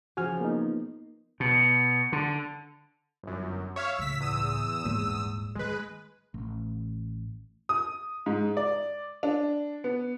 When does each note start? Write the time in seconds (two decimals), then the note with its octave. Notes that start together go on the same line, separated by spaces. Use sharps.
0.17 C#3 F3 F#4 G#5 F6
0.40 A#3 B3 D#4
1.40 B2
2.12 D3
3.23 G1 F#2
3.76 C#5 E5 F5
3.98 C#2 A2 E6 B6
4.21 E2 D#6 E6
4.84 D#1 G#2
5.55 D#3 G#3 B4
6.34 A1
7.69 D#6
8.26 G#2
8.57 D5
9.23 D4
9.84 B3